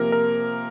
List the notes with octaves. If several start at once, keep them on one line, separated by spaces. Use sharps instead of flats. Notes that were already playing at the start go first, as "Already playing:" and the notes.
Already playing: C3 F3 A#3 A#4
A#4